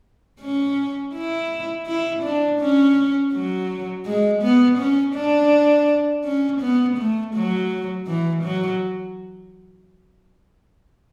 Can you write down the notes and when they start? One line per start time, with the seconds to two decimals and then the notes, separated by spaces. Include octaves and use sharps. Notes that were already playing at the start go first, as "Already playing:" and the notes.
0.40 C#4
1.14 E4
1.87 E4
2.23 D4
2.60 C#4
3.33 F#3
4.05 G#3
4.43 B3
4.78 C#4
5.15 D4
6.24 C#4
6.61 B3
6.98 A3
7.35 F#3
8.07 E3
8.43 F#3